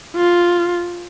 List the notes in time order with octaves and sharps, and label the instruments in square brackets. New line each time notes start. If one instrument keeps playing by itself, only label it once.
[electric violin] F4